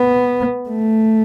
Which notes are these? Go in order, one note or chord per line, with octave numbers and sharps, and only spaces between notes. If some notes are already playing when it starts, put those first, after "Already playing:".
Already playing: B3
A3